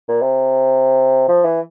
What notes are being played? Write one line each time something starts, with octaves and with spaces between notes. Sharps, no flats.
A#2
C3
F3
E3